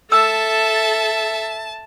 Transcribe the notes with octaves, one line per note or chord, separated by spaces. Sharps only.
A4 E5 A5 E6